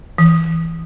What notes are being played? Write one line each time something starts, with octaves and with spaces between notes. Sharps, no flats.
E3